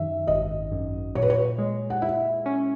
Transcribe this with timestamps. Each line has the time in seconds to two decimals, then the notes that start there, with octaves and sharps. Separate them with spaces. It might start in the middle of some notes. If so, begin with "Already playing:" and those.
Already playing: F#2 D#3 E5
0.27 G#1 D#5
0.72 F#2
1.15 A#2 C#5
1.22 B4
1.30 C#5
1.58 G#3
1.90 F#5
2.02 E4 E5
2.46 C#4